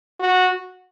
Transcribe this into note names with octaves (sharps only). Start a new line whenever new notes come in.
F#4